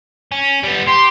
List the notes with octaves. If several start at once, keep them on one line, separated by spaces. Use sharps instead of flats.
C#4
G3 B3
G4 C6